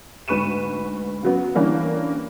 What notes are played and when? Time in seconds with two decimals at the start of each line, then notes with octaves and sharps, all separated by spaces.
0.28 D2 G#2 B4 C#6 D#7 E7
1.23 C#3 F#3 B3
1.55 D3 E3 G3 A#3 C#4 D4